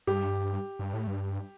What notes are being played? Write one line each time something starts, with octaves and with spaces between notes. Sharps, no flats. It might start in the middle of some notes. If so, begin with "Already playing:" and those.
G2 G4
G2
A2
G2